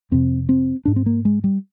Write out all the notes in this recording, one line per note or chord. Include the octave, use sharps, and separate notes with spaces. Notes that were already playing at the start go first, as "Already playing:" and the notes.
F2 C3 C4
C4
G#2 D4
C4
A#3
G#3
G3